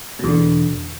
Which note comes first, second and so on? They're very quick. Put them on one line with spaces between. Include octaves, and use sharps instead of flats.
B2 E2 D3